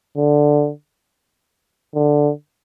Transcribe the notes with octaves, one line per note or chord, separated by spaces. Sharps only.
D3
D3